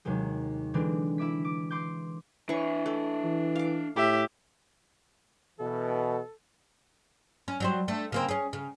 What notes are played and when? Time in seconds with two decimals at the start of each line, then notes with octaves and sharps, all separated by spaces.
0.05 D#2 C3 F#3 G#3
0.74 D3 E3 G#3 C4 D4
1.18 E4 E5 D6 B6
1.45 D6
1.70 C6 D6 G6
2.49 E3 D4 C#5 C#6
2.86 A3
3.24 E3
3.55 F5 D6
3.96 A2 G4 E5
5.59 B2 E3 A4
7.48 C#4
7.60 F#3 G3 C5
7.88 A3 D4
8.12 C#3 A#3 C4
8.28 C#4 G#4
8.53 C#3